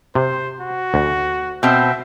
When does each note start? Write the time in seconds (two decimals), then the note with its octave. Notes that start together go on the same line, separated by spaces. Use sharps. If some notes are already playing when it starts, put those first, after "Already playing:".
0.15 C3 C5
0.60 F#4
0.94 D2
1.63 B2 C4 E5